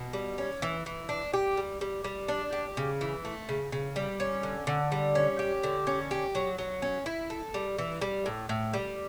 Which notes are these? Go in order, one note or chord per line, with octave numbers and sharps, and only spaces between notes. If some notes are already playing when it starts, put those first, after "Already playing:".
Already playing: B2
G3
C#4
E3
E3
D4
G4
G3
G3
G3
D4
G4
C#3
E3
A3
C#3
C#3
G3
C#4
D3
D3
G3
C#4
G4
D3
C#4
G4
F#3
F#3
C#4
E4
A4
G3
E3
G3
A2
A2
G3